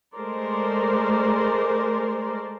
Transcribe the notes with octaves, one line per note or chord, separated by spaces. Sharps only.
G#3 A3 A#4 C5 D5